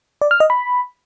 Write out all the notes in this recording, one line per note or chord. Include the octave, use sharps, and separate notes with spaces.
D5
F6
D#5
B5